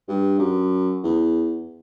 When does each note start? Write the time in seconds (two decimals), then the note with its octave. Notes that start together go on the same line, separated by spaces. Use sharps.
0.08 G2
0.39 F#2
1.04 E2